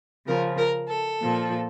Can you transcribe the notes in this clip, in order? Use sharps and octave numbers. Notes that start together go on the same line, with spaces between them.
C#3 F3 A#4
A#4
A4
A#2 F3